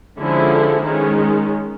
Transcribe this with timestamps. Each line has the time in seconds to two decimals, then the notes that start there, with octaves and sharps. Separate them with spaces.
0.19 D3 F3 G#3 C#4 E4
0.83 D#3 G#3 C#4